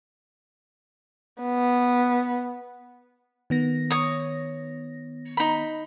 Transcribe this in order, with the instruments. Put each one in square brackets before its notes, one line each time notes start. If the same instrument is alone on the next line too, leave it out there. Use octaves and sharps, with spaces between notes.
[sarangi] B3
[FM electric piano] D#3 B3 A#6
[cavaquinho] C#5 D#6
D#4 B5